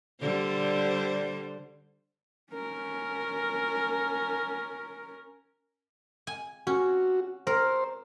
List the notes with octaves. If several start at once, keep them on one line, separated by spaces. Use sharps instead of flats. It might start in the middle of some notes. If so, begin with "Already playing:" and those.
D3 G3 C5
C#4 A#4
G#5
C#4 F#4
A#4 C5